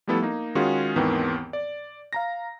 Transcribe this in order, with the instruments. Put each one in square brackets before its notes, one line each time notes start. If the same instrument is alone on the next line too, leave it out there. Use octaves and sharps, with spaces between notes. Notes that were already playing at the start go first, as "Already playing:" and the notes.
[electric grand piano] F3 G3 A3 B3 E4 A4
A#3 D#4
D#3 G#3 C#4 F4 F#4 G#4
D#2 G#2 D#3 E3 B3 C4
D5
F5 A#5 A#6